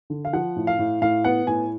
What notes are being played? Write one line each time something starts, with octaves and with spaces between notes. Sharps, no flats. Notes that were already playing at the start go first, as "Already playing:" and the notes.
D3
F5
F3 F#5
A2
F5
A2
A2 F5
B3 F#5
A2 G#5